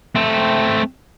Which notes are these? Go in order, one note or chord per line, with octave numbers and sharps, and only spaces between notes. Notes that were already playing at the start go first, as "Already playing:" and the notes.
A3 C4